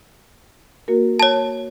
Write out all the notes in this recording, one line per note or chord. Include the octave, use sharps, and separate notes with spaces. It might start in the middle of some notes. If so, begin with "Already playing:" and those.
A#3 F#4 A#4
C#5 A5